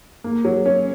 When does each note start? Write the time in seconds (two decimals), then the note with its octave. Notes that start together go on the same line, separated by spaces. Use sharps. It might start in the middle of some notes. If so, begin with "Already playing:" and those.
0.24 A#3
0.45 F#3
0.66 C#4